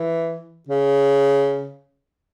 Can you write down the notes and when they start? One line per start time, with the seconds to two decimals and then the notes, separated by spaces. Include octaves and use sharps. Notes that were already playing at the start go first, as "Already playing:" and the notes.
Already playing: E3
0.68 C#3